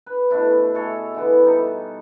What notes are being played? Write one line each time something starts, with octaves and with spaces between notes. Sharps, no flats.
B4
B2 A3 D4 E4
G#4 A4 C#5 E5
D3 E3 B3
G3 D#4 A4